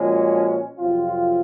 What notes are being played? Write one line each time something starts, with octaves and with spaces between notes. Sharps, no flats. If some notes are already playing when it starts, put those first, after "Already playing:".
Already playing: A#2 F3 G#3 C#4 F#4
F2 C3 F#3 C4 F4